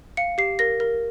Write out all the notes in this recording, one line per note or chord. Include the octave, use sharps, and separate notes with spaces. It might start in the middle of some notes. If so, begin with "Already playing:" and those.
F5 C#7
G4 C7
A#4 A#6
A#4